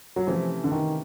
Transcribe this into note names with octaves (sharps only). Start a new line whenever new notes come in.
F#3
C3 E3 F3 A3 C#4
D3
D#3